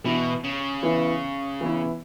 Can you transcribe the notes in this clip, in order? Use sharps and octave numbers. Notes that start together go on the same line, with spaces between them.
B2 E3 B3 E4
C#3
E3 B3 E4
E3 B3 E4